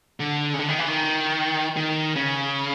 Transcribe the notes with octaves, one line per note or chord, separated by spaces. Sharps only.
D3
C#3
D3
D#3
E3
D#3
D#3
C#3